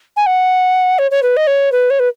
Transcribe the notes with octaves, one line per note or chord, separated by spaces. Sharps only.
G#5
F#5
C#5
C#5
B4
D#5
C#5
B4
C#5
B4